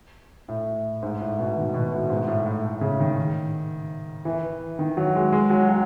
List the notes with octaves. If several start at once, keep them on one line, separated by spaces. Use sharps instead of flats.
A2
G#2
A2
B2
D#3
B2
A2
G#2
A2
A2
A2
C#3
D#3
E3
D#3
F#3
G#3
G#3
F#3
F#3